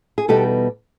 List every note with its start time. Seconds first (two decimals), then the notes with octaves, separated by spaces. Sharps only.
0.18 G#4
0.28 E2 B2 G3 B3 D#4 G4 A4